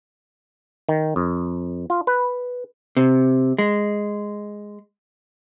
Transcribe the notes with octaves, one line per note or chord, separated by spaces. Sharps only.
D#3
F2
F4
B4
C3
G#3